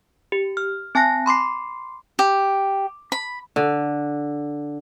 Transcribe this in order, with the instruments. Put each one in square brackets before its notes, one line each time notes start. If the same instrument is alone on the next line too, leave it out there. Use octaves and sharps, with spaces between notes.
[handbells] G4
F6
C4 G#5 A5 F#6 A#6
B5 C6 D6 C7
[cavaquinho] G4
B5
[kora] D3